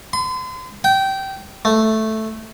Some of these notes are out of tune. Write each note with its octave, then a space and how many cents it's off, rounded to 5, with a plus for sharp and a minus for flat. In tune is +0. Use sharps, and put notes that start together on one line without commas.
C6 -40
G5 -20
A3 +0